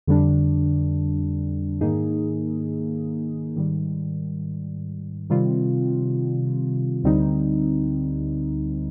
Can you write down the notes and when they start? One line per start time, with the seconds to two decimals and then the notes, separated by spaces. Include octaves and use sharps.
0.07 F2 D3 G3 D4
1.81 G#2 D#3 A#3 D#4 G#4
3.56 G#2 D#3 G3
5.30 C3 D#3 G3 C4 F4
7.03 D2 D3 G3 C4 D#4